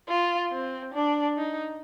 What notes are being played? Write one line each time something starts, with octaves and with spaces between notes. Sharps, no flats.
F4
C4
D4
D#4